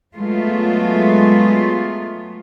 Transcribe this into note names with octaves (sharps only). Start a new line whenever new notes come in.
F#3 G#3 A3 B3 F4